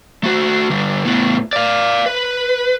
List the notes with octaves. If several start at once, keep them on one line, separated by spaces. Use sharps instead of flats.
A3 F#4
D3 G3
A2 B3
D5 F5
B4